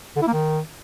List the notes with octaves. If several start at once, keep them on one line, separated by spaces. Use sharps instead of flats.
D3
E4
A#3
D#3